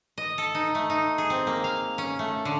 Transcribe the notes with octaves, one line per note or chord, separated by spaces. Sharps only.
D#5
A4
D#4
A3
D#4
G#4
C4
A#3
F5
C#4
A3
D3